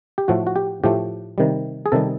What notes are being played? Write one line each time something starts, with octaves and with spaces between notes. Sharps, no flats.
G4
A2 F3 A3 F#4
F#4
G4
A2 F3 A3 G4
C3 D#3 G3
G#4
C3 D#3 G3 A4